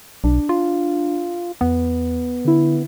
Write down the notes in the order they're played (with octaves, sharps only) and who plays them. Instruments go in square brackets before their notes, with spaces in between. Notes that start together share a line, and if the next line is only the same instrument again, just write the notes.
[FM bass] B1 [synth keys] D4
[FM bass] F4
[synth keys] E2 [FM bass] B3
[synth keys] D3 E4